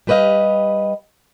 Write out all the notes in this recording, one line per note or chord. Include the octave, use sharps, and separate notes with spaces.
G3 G4 B4 D5 D#5 F5